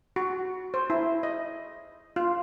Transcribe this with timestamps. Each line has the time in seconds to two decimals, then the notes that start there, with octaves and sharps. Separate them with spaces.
0.16 F#4
0.74 C5
0.90 E4
1.23 D#5
2.16 F4